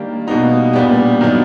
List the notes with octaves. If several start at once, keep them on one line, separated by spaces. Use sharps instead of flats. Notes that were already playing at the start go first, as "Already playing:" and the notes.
Already playing: D#3 G3 A#3 D4 G4
B2 G3 A#3 D#4 F#4
A#2 G3 B3 D4 G4
D#3 F#3 B3 D4